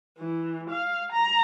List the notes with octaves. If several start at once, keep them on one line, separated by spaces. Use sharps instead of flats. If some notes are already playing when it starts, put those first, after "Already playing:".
E3
F5
A#5